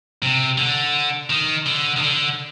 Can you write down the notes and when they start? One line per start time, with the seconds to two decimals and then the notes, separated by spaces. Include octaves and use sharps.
0.23 C3
0.58 D3
1.30 D#3
1.66 D3
1.97 D#3
2.02 D3